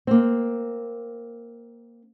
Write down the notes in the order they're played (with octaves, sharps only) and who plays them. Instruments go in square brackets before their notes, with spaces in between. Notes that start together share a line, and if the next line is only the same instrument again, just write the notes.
[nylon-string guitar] A#3 C4